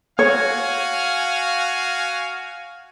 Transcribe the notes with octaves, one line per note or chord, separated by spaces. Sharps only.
F#4 C#5 F5 G#5